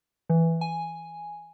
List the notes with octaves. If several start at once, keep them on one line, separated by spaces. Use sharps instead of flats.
E3
G#5